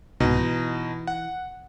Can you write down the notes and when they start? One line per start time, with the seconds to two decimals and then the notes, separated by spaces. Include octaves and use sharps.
0.20 C2 G#2 B2 D#4
0.38 E3
1.07 F#5